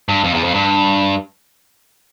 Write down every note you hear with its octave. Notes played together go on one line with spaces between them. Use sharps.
G2
F2
E2
F2
G2